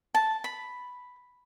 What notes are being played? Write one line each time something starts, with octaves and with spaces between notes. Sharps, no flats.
A5
B5